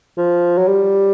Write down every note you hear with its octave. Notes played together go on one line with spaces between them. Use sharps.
F3
F#3
G3